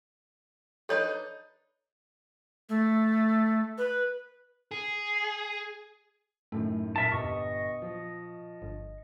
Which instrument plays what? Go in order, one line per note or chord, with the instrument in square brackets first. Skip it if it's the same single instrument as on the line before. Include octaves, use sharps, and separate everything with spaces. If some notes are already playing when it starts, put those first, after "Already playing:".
[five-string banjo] D4 D#4 B4 [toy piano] A4 C#5
[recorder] A3
B4
[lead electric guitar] G#4
[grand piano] F#2 A2 D#3 [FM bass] A3
[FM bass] A#2 [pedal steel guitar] A#4 E5 A5
[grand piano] G1 [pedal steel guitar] D#5 C#6
[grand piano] F3
[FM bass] G1